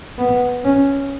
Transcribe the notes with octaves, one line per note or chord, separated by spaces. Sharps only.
B3
C#4